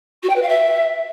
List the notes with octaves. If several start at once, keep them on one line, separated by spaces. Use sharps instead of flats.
F#4
G5
B4
F5
E5